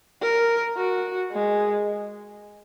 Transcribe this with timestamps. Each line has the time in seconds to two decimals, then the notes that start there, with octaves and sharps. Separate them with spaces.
0.22 A#4
0.76 F#4
1.32 G#3